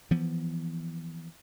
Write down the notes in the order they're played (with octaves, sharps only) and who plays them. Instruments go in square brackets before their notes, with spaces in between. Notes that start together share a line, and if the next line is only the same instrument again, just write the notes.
[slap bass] E3 F3 B3